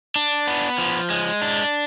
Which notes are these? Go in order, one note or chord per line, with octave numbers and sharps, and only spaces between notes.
D4
B3
F3
G#3
D4